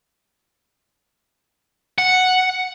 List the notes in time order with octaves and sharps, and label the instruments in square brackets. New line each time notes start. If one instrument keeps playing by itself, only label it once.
[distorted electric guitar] F#5